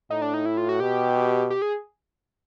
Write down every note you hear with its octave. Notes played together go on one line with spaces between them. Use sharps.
A2 D#4
D4
D#4
E4
F4
F#4
B2 G4
G4
G#4